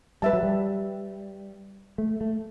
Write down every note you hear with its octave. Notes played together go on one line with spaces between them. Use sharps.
G3 B4 E5 A5
F#3
G3
A3
A3